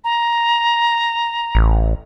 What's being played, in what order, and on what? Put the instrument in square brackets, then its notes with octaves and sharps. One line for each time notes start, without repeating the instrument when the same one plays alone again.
[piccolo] A#5
[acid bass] A1